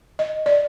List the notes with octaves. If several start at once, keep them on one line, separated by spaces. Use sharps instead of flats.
D#5
D5